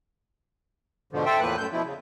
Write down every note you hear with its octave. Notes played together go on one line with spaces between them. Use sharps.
G#2 B2 D3 F3
A4 C5 E5 G5
E2 A2 F3 A#3 B4 F#6
F#2 A2 G6
B2 F3 E4
C#3